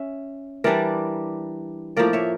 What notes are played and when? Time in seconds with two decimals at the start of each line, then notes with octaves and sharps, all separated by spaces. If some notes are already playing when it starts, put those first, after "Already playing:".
Already playing: C#4 E5
0.64 E3 G3 D4 A#4 D5
1.97 A2 F3 A#3 A#4 D5
2.13 C#5 E5